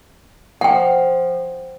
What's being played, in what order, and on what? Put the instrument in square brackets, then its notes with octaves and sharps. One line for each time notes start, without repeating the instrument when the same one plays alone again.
[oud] F3 [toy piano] F#5 G5